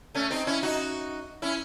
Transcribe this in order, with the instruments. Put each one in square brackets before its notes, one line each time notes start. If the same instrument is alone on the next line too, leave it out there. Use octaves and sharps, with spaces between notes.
[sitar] A3 C#4
C4 D#4
C#4 E4
D#4 F#4
C#4 E4